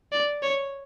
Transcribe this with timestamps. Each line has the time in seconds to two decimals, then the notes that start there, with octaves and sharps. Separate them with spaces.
0.12 D5
0.43 C#5